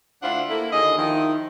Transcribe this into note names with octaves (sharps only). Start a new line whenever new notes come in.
D2 D4 E4 F4 C5 F#5
A#3 E4 A4
D#2 D3 G#4 D#5
D#3 F3 E4